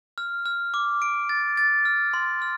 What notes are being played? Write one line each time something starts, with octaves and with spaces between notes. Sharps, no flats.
F6
F6
D6
D7
A6
A6
F6
C6
F6